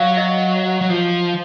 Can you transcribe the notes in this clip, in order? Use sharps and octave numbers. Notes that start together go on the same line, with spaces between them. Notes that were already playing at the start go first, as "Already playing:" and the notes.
Already playing: F#3 F5
D#5
F#3
F3